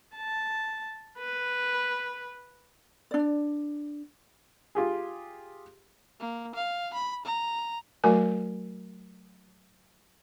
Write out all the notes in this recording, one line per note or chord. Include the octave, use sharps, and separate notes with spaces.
A5
B4
D4 D5
F4 G4 G#4
A#3
F5
B5
A#5
F#3 A3 F#4 A#4 G#5